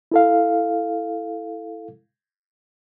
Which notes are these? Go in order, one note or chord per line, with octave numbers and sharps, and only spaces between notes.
E4 A4 F5